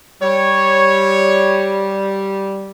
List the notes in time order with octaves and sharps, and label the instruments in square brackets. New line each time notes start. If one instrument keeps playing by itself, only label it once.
[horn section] G3 [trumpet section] C#5